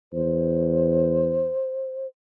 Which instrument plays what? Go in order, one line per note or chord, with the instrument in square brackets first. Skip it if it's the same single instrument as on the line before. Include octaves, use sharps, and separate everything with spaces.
[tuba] E2 [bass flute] C5